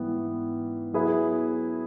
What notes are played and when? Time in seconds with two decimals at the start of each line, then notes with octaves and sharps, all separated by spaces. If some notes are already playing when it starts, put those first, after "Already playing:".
Already playing: G#2 E3 G3 B3
0.93 F#3 B3 E4 G#4 B4